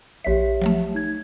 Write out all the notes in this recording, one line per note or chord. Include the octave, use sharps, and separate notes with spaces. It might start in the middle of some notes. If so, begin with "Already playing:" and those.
A#1 G4 C#5 E5 B6
F3 F#3 A3
D#4 G#6